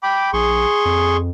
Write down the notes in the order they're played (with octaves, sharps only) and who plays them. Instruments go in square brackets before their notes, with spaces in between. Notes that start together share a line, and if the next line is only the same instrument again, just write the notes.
[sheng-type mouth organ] G5 B5 D6
[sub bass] A#1 [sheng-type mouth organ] G#4 C6 C#6
[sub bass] F2